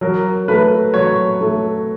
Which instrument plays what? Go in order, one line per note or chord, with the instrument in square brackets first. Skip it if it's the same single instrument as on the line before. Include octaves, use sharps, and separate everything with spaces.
[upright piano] F#3 [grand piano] A#4
[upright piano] A3 [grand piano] B4
[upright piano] F#3 [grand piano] C#5
[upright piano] A3